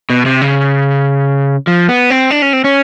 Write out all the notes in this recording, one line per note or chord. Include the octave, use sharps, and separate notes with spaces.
B2
C3
C#3
F3
B3
C4
D4
C#4
C4
C#4